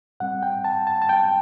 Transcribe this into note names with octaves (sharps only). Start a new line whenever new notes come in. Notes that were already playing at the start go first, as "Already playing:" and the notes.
A2 G3 C4 F#5
G5
A5
A5
A5
G5